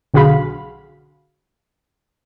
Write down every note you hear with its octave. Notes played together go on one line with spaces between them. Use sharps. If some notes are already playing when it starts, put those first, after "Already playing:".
B1 D3 F#4 G#4 F5 B5